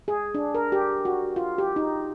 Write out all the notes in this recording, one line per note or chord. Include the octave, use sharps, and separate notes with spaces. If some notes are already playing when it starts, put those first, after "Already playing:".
G#4
D4
A#4
G4
F#4
F4
G4
D#4